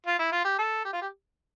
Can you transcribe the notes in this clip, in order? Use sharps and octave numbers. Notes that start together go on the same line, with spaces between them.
F4
E4
F4
G4
A4
G4
F4
G4